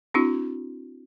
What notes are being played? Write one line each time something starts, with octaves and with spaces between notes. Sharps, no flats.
C4 D4 E4 F#4